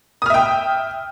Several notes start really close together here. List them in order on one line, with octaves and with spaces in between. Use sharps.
D#6 F6 E5 G5